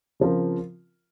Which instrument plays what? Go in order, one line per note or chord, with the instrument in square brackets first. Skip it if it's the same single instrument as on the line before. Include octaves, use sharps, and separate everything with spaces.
[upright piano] C#3 F3 C4 F4 A#4